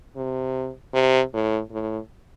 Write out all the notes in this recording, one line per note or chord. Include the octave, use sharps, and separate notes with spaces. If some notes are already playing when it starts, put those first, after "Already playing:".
C3
C3
A2
A2